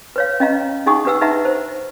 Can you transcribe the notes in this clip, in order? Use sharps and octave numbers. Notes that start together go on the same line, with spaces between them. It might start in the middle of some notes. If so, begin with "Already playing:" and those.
B4 C#5 F5
C#4 D#5 F5 A#5
D4 D#4 G#4 F#5 C#6 D#6
D4 G4 B4 F#5 E6
D#4 B4 E5 F#5 A#5
C5